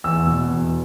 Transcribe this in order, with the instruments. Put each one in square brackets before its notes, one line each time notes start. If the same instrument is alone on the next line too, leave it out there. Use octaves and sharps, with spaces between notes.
[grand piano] E2 E6
B2
E2